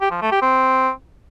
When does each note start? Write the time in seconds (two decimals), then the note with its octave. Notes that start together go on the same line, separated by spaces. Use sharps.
0.01 G4
0.11 F3
0.21 A3
0.32 G4
0.42 C4